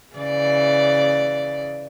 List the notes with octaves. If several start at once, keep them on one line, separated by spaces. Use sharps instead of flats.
C#3 E3 D5